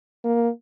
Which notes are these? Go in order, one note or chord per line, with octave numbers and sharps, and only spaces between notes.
A#3